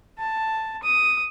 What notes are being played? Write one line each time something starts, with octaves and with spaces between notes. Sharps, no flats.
A5
D#6